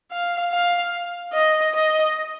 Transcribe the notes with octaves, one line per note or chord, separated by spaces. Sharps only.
F5
F5
D#5
D#5